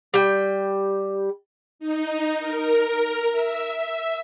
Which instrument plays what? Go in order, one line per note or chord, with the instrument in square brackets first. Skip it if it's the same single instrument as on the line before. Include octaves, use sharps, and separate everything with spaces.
[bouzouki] G3 G5
[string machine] D#4
A#4
E5